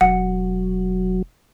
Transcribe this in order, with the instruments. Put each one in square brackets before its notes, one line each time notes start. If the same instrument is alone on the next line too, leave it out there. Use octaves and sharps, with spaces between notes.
[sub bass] E1 [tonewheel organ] F#3 [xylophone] F#5